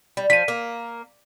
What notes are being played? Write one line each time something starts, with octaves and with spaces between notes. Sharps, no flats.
G3
F3 B6 D#7
A#3